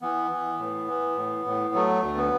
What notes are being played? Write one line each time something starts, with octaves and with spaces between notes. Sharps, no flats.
E3 B3
E3
A2
E3
A2
A2
F#3 A3
D2
B3